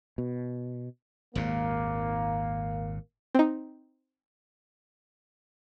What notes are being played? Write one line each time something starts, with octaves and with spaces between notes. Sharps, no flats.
B2
G#1 D#2 A#2 A#3
C4 D#4